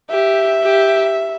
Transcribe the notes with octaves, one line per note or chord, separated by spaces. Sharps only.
G4 E5
G4